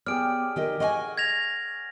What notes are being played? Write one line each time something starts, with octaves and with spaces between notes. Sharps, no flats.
B3 G4 G#4 D5 F6 D7
D#3 G4 D#5
D#5 F5 F#5 G#5 C#6
G#6 A#6 F7